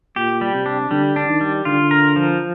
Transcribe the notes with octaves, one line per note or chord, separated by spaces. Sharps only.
A#2 G4
G3
C3
D4
D3 G3
D4
D#3
G3
D3 F4
A#4
F3